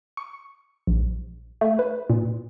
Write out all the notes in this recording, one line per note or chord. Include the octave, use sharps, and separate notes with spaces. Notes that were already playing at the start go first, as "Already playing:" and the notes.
C#6
A#1
A3
B4
A#2